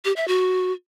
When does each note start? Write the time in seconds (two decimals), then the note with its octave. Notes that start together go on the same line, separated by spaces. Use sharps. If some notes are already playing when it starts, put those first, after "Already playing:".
0.05 G4
0.16 E5
0.28 F#4